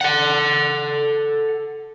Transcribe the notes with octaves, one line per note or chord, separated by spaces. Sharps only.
A4 F#5